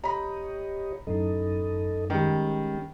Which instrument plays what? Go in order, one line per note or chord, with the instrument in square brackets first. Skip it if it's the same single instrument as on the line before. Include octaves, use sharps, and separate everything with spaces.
[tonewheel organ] G4 C#5 D#5 [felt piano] A#5 B5
[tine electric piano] F#2 A2 D#4 [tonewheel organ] A4 D#5
[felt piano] D#3 G3 [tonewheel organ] G#3 C#4